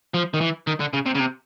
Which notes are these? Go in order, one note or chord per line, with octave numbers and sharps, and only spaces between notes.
F3
D#3
E3
D#3
D3
C#3
C3
C#3
C3